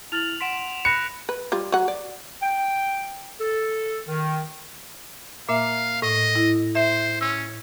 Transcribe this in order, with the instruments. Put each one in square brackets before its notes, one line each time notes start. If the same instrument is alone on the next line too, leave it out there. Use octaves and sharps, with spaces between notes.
[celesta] E4 F6 A6 [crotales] F7 F#7
[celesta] F#5 C6 [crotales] B6 D7 E7
[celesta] B5 [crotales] F#6 A#6 [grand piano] C#7
[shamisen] B4
G3 F4
F#3 F#5
D5
[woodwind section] G5
A4
D#3
[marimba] A#2 A#3 E5 [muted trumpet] F5
[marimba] A2 [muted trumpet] D#5
[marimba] E4
[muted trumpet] C5 [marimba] E5
[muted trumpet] C#4 [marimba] E6